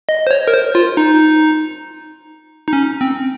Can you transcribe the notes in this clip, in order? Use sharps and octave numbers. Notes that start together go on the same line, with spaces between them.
D#5
C5
C#5
A#4
C5
F4
D#4
D#4
C#4
C4